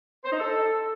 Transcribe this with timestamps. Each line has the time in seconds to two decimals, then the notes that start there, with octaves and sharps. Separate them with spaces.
0.24 C5
0.32 D#4
0.40 A4